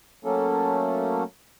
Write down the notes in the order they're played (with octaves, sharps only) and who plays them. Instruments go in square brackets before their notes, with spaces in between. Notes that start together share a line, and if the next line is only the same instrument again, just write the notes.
[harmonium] F#3 A3 A#3 C#4 A4